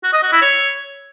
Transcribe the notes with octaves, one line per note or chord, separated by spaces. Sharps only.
F#4
D#5
F#4
E4
C#5